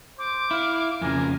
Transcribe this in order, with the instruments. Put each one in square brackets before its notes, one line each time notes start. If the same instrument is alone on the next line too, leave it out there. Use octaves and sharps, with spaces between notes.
[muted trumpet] C5 [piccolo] D6
[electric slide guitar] E4 [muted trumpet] F5
[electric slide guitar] F2 C#3 [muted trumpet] A#4 [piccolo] G#5